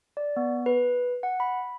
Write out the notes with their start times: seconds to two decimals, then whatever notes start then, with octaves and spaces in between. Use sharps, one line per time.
0.17 D5
0.36 B3
0.66 B4
1.23 F#5
1.40 B5